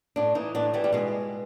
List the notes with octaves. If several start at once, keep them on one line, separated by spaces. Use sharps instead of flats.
A2 D4
E3 D#4
A2 D4
E3 G3
G3
B2 G#3